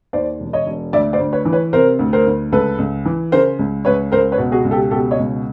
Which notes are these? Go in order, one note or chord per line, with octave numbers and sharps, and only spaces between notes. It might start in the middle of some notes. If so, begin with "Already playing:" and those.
D#2 C5 D5
E1
C#5 D#5
E1
D2 D5 E5
C5 D5
D2
B4 C#5
E3
B4 C#5
C3 A#4 C5
D2
A#4 C5
D2
C#2 A4 B4
C#2
E3
C#3 A#4 C5
C#2
C#2 B4 C#5
C#2 A#4 C5
B4 C#5
B2
F#4 G#4
C#2
G4 A4
B2 G4 A4
C#5 D#5
C#2